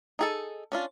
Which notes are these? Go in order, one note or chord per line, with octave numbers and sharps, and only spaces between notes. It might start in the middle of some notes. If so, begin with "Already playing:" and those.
D#4 G#4 A4
C#4 D4 F4